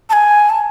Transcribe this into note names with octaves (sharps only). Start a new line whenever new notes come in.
A5
G#5
A5